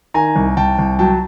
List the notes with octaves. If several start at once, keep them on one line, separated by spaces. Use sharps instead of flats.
D#3 G#5 A#5
C2
C2 G5 A5
C2
F#3 G5 A5